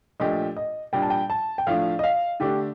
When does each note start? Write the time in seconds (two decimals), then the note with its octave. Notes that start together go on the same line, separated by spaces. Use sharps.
0.20 A#2 F3 A3 D4 G4 D#5
0.57 D#5
0.93 A#2 G3 D4 G5
1.02 A5
1.10 G5
1.30 A5
1.58 G5
1.67 A2 F3 A3 D4 F5
1.99 D#5
2.04 F5
2.40 D3 A3 D4 G4